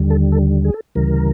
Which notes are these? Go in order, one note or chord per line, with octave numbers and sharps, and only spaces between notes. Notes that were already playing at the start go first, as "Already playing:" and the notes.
Already playing: D#2 D3 G3
A4
A4
G#4
A4
D2 C#3 E3 G3 A#4